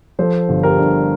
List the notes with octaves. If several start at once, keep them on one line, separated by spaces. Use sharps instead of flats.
F3 A4 C5
G1
G4 A#4
G2